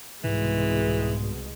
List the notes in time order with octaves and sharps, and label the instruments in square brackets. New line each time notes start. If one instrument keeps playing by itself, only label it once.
[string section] C2 B2 G#3 [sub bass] G#2 [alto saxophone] E3